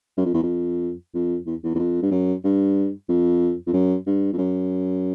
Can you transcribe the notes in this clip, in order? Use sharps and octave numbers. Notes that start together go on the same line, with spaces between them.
F#2
F2
E2
F2
F2
E2
E2
E2
F2
G2
F#2
G2
F2
F2
F#2
G2
F2
F#2